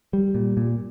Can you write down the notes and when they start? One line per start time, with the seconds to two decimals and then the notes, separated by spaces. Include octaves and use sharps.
0.13 G3
0.35 A#2
0.57 A#2